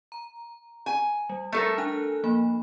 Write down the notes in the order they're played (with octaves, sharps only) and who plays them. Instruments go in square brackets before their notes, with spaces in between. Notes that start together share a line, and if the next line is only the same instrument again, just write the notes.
[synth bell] A#5
[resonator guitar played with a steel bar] G#5
[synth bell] G3
[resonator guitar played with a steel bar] A3 A4 A#4
[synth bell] D4 G#5 F#6
F3 A#3 B5